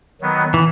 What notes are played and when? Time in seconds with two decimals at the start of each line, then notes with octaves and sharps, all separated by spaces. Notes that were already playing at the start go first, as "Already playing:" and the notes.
0.21 D#3 F#3 B3
0.54 E3